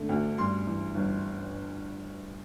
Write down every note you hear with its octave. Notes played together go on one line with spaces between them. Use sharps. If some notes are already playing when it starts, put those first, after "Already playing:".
Already playing: D3 A3
D2
G2 C6
E3
G1